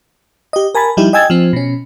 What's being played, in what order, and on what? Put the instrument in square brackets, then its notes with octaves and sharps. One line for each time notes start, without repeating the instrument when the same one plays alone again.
[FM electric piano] G4 D#5
A#4 G#5 A5 B5 A6
F3 G3 D#4 E4 G4
D#5 G5 G#5 E6 G#6 A6
F3 C4
B2 C#4